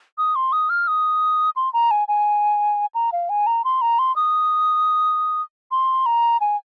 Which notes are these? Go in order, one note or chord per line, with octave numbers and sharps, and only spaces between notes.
D#6
C6
D#6
F6
D#6
C6
A#5
G#5
G#5
A#5
F5
G#5
A#5
C6
A#5
C6
D#6
C6
A#5
G#5